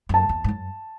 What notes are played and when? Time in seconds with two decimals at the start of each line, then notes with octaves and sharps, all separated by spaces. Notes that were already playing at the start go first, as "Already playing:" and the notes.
0.09 F#2 A5
0.29 E2
0.44 G#2
0.48 F#2